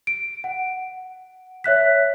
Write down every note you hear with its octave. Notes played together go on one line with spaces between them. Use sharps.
D7
F#5
C#5 E5 F#6 B6